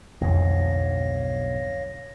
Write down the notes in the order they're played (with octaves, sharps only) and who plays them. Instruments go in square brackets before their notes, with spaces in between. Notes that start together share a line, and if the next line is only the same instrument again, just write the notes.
[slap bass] B1 G#2 [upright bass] F2 D3 [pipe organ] C#5 F5 A#6